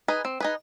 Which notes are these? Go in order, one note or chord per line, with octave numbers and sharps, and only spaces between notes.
D#4 G#4 B4
C4
D#4 G#4 B4